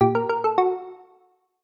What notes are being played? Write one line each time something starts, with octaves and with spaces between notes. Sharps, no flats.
A#2 G4
A#4
A#4
A4
F#4